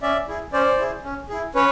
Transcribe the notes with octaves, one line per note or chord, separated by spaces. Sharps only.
C#4 D5 E5
E4 G#4
C#4 C5 D5
E4 G#4
C#4
E4 G#4
C#4 B4 C#5